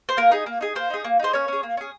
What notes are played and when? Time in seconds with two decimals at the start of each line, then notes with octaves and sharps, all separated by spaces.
0.09 C5
0.17 A#3 A#4
0.31 D#4 G#4
0.46 A#3
0.61 D#4 G#4
0.75 A#3 C5
0.90 D#4 G#4
1.04 A#3
1.20 D#4 G#4 C5
1.33 A#3 C#4 C#5
1.48 C#4 G#4
1.63 A#3
1.77 C#4 G#4